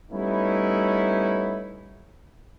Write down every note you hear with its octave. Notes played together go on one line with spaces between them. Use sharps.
G3 A3 B3 C#4 D#4 E4